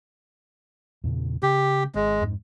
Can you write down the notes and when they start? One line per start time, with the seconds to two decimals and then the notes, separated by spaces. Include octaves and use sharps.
1.04 E2 A#2 C#3
1.43 C#3 G4
1.95 G#1 G#3
2.21 F2 G#2